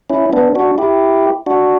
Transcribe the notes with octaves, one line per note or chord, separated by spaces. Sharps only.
C#4 E4
B3 D4
D4 F#4
E4 G4
D4 F#4